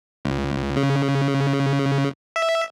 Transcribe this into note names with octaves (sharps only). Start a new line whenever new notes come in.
C#2
C#3
E5